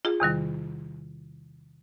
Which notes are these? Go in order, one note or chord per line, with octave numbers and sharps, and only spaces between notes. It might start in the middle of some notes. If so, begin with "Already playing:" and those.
F4 G#4
E2 C3 D#3 G3